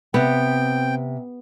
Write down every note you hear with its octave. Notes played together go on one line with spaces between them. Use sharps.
C3 B3 C4 G5